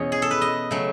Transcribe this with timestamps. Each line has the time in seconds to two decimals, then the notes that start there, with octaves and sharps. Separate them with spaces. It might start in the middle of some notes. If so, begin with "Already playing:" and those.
Already playing: E2 B2 C#4 C#5 D#5
0.12 G#4
0.22 A4
0.31 B4
0.41 D#5
0.71 C#3 F#3 A3